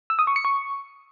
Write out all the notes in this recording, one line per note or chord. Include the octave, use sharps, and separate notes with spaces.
E6
D#6
C#6
C#7
C#6